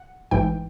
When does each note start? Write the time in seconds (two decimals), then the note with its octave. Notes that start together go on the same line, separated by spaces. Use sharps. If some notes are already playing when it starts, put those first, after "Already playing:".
Already playing: F#5
0.31 A1 G#2 E3 G5